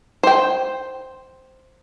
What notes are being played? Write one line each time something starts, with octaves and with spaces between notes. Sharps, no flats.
C5 G5